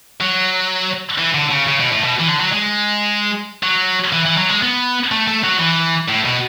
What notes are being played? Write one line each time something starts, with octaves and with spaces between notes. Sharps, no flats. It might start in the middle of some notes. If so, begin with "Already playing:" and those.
F#3
E3
D3
C#3
C#3
B2
A2
B2
E3
D3
F#3
G#3
F#3
E3
E3
F#3
G#3
B3
A3
A3
F#3
E3
A2
B2